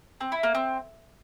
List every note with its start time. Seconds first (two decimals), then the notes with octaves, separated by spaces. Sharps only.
0.20 C4
0.32 E4
0.43 A#3
0.55 C4